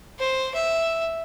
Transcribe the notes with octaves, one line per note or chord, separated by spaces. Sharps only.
C5
E5